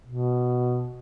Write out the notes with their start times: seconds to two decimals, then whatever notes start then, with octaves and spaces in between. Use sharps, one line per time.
0.07 B2